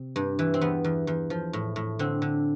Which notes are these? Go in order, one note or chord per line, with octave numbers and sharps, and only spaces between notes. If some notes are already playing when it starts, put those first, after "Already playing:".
Already playing: C3
G2
E3
C4
E2 B3
E2
E2
F3
A2
A2
D3 C4
D3